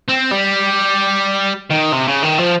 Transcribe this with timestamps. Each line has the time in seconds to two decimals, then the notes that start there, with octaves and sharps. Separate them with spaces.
0.08 C4
0.31 G3
1.70 D#3
1.92 C3
2.07 C#3
2.23 D#3
2.38 F3